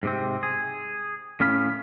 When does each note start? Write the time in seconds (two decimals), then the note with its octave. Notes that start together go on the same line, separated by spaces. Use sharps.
0.03 G#2 C3 C4
0.43 G#4
1.40 A2 C#4 F5 B5